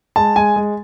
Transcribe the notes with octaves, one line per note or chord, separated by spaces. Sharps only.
G#3 A5
G#3 G#5
G#3